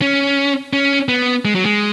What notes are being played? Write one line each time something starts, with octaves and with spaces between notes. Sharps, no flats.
C#4
C#4
B3
G#3
F#3
G#3